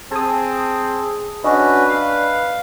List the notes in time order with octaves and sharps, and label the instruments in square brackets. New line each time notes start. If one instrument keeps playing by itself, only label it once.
[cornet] C4 [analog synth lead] G#4 [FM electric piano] A5 D#6
[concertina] C#4 F#4 [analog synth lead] D4 [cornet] B4 [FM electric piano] D#5
[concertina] F5